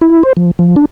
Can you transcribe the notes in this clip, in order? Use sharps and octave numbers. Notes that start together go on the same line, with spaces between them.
E4
C5
F3
F3
D4